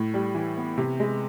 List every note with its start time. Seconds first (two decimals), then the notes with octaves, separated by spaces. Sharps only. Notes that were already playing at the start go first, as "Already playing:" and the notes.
Already playing: A2
0.14 G3
0.35 E3
0.57 B3
0.78 C3
1.00 G#3